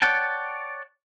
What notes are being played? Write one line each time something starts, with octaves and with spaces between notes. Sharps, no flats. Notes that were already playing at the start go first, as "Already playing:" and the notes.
C#5 D5 F#5 G5 A5